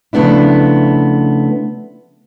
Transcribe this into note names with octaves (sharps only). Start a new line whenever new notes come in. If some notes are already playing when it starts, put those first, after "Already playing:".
C#3 F3 A3 B3 D4 E4